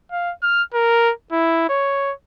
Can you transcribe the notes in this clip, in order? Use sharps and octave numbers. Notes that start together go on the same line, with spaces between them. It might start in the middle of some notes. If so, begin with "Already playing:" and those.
F5
F6
A#4
E4
C#5